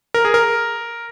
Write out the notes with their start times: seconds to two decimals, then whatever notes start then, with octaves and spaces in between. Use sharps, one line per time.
0.14 A#4
0.25 G#4
0.34 A#4